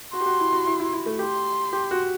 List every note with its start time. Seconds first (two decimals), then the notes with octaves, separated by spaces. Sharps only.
0.13 F#4 C6
0.21 G4
0.26 F#4
0.40 E4
0.53 F#4
0.67 E4
0.80 E4
0.93 E4
1.06 A3
1.19 G4 C6
1.73 G4
1.91 F#4